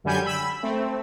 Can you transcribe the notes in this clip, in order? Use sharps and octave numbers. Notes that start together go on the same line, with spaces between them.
F#2 D3 G3 G#5 G6 G#6
B5 E6
A3 C4